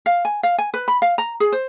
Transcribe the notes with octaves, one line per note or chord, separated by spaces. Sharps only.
F5
G#5
F5
G#5
B4
B5
F5
A#5
G#4
C5